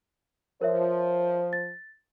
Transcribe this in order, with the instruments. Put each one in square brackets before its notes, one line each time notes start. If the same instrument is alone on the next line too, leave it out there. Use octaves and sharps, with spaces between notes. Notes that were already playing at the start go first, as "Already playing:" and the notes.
[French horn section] F3 C5 [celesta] A#4 C#5 E5
[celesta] A6